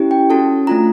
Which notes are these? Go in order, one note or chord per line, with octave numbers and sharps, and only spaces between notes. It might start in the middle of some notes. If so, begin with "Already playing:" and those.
Already playing: C#4 E4 G4
G5
C#4 F#4 A4 A5
A3 D4 F4 A#5